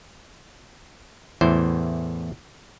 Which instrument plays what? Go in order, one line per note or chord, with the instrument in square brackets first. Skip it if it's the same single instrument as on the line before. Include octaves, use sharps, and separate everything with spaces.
[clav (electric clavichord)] E2 A2 E3 C5